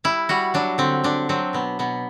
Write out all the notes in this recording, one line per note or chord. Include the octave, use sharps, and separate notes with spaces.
G3 E4
G3 F#4
F#3 D4
D3 C4
D3 D4
F#3 C4
B2 B3
B2 B3